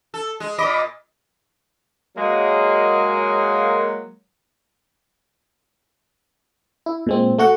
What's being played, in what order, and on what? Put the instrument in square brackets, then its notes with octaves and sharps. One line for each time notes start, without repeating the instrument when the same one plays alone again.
[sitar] A4
G#3
[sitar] A#2 D#5 [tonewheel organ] B5 D6
[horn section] F#3 G#3 A#3
[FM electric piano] E4
A#2 G#3 C4
A3 F#4 F#5